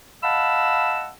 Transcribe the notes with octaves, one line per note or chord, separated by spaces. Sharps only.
D#5 F5 F#5 A5 B5 E6